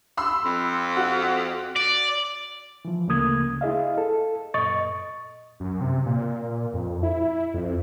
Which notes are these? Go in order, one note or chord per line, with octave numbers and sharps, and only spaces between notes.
B5 C6 E6
F2
F#4
D5
E3 F3
D2 C#3 A3 A#3 D#6 G#6
E4 G#4 D#5 F5
A4
F#2 A#2 D#5 C#6 A6
F#2
C3
A#2
F2
E4
F2